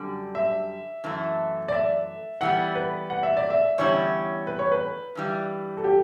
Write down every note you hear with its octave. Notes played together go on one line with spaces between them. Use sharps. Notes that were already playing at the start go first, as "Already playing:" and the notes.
Already playing: F#2 D3 G3
E5
F#2 E3 A3
D5
E5
E3 G3 B3 F#5
B4
F#5
E5
D5
E5
E2 D3 G3 C#4 E4 C#5
B4
C#5
B4
G2 E3 G3
A4
G4